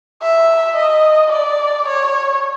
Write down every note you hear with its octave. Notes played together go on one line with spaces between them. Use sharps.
E5
D#5
D5
C#5